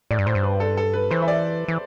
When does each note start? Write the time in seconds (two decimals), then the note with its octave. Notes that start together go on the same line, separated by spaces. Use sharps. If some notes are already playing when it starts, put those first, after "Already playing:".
0.11 A2 D5
0.18 G2
0.26 A2 C5
0.35 G2
0.43 B4
0.60 A4
0.77 A4
0.93 B4
1.11 E3 C5
1.22 E5
1.28 D5
1.68 E3